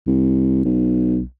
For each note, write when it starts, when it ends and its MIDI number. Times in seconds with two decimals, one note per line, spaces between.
0.07 0.63 36
0.65 1.22 35